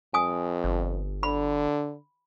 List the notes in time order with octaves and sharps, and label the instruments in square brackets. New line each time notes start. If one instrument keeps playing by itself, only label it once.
[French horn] F2 [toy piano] G#5 D#6
[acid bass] G1
[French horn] D3 [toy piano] B5